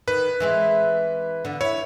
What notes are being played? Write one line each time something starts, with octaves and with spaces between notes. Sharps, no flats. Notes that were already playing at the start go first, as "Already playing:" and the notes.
D#3 B4
E3 G#3 C4
D3 B3
E4 C#5